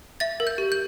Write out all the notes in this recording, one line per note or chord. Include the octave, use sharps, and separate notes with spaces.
E5 A6
A#4
G6
G4
G6